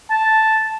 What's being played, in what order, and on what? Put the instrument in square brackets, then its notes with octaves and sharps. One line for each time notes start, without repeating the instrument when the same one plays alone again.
[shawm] A5